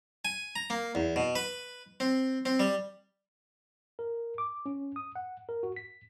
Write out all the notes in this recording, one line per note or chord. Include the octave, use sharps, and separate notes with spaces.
G#5
A#5
A#3
E2
B2
B4
C4
C4
G3
A#4
D6
C#4
D#6
F#5
A#4
F#4
B6